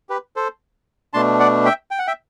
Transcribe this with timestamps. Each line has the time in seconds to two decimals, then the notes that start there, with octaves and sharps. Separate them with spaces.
0.09 G4 B4
0.36 A4 C5
1.13 B2 A3 D4 A5 C6
1.40 D5 F#5
1.65 E5 G5
1.91 G5
1.99 F#5
2.07 E5 G5